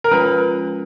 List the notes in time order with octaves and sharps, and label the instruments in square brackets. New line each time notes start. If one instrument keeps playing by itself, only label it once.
[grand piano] A#4
[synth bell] F3 G#3 C#4 F4 [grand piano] B4